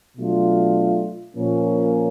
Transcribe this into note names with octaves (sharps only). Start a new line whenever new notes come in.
B2 F#3 A3 D4 F4
A#2 F3 A#3 C#4